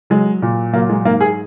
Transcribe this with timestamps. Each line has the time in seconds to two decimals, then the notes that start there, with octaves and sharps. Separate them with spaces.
0.10 F#3 G#3
0.42 A#2
0.73 F#3 A#3
0.89 G#3
1.05 G#2 A#3
1.21 G#4